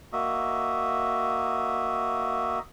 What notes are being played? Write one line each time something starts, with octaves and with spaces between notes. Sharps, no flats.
A#3 F#4 D#5 E5